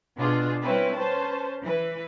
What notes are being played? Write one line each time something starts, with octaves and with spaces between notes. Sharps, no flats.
B2 D4 F4 G#4
G3 C4 C#4 E4 B4
C#4 B4 C5 A5
E3 B4